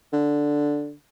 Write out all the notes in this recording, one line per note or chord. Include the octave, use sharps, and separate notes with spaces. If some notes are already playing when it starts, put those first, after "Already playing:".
D3